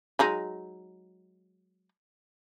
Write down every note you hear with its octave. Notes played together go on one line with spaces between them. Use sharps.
F#3 G#3 D#4